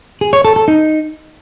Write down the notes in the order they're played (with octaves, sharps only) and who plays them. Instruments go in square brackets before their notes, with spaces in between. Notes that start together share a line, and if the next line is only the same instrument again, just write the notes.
[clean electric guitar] G#4
C#5
A4
A4
D#4